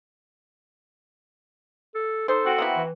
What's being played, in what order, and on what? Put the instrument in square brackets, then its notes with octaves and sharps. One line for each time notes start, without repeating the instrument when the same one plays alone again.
[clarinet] A4
[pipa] D#4 C5 [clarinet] A4
[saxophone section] C4 F#4
[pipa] A#3 B3 E4
[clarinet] E3